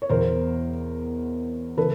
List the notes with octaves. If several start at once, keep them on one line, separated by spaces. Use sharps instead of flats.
C#5
E2 B2 A#4 C5
C#3 E3 A4 B4